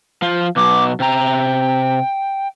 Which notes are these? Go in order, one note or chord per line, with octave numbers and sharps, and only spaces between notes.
F3 F4
B2 F#3 D6
C3 G5 A#5